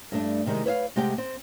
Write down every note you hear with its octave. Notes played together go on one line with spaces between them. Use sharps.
G2 A3 D4
C3 D#3 G3 G#3
B4 C#5 E5 F5
C3 G#3 A3 G4 F#5 G5
C4